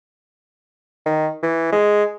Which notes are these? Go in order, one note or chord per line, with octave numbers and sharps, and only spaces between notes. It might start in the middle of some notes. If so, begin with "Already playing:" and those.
D#3
E3
G#3